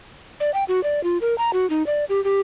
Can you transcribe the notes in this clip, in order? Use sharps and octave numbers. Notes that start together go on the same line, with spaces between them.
D5
G5
F#4
D5
F4
A#4
A#5
F#4
D#4
D5
G4
G4